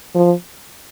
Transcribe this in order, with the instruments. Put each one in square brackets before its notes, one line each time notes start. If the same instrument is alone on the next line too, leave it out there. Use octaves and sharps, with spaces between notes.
[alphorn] F3